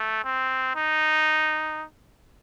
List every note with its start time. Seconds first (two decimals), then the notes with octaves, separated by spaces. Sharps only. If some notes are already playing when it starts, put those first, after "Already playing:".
Already playing: A3
0.24 C4
0.75 D#4